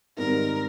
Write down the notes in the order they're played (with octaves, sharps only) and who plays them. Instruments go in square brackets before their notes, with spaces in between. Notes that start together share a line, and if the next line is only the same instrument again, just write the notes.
[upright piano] G#2 D#3 G3 C4 D#4 [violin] A#4